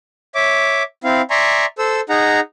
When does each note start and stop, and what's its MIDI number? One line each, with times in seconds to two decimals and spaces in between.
0.35 0.83 73
0.35 0.83 76
0.35 0.83 86
1.04 1.22 60
1.04 1.22 64
1.04 1.22 77
1.30 1.66 74
1.30 1.66 76
1.30 1.66 80
1.30 1.66 82
1.30 1.66 84
1.30 1.66 85
1.78 2.01 69
1.78 2.01 72
1.78 2.01 88
2.09 2.40 63
2.09 2.40 68
2.09 2.40 78
2.09 2.40 82